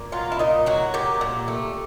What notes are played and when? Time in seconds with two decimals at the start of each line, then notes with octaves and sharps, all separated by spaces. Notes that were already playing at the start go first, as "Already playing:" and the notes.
Already playing: A#2
0.12 F#3 F4
0.32 E4
0.39 A#2 D#4
0.66 F#3 F#4
0.94 A#2 G4
1.21 A#2
1.48 A3